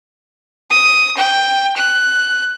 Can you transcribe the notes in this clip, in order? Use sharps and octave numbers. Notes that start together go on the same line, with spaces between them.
D#6
G5
F#6